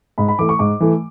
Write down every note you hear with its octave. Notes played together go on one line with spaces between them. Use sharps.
G#2 B5
B5
E3 A3 D6
C#6
G#2 D6
E3 A3